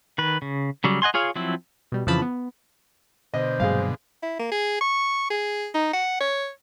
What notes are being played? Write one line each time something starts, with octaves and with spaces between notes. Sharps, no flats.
D#3 B4
C#3
C#3 F#3 G3
D#5 F#5 G#5 C6
F4 G#4 C#5 F5
F3 F#3 C4 E4
B2 G3
F2 C#3 E3 F3 A5 B5
B3
B2 D3 C5 D#5
G2 A#2 F#3 G#3 F5
E4
A#3
G#4
C#6
G#4
D#4
F#5
C#5